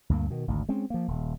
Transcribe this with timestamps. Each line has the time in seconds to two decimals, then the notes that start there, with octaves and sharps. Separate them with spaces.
0.09 D2 G2 A#3
0.30 B2 D#3
0.48 G#1 D2
0.69 G#3 C4 C#4
0.90 F3 A#3
1.08 D#1